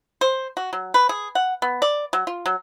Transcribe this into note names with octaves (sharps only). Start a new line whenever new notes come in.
C5
F#4
F#3
B4
G#4
F#5
B3
D5
F#3
F4
F#3